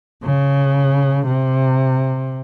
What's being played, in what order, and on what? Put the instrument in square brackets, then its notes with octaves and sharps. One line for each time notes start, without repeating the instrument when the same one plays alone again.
[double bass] C#3
C3